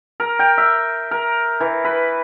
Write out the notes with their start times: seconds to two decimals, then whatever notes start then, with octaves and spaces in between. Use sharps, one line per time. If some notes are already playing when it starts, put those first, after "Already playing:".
0.20 A#4
0.39 G5
0.58 E5
1.11 A#4
1.60 E3
1.85 B4